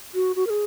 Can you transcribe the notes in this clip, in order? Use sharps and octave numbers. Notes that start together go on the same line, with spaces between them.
F#4
F#4
A#4
G#4